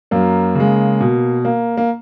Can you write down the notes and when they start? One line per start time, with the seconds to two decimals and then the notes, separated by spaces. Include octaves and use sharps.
0.11 F#2 A#3
0.55 C#3 G#3
1.00 B2
1.45 A#3
1.77 A#3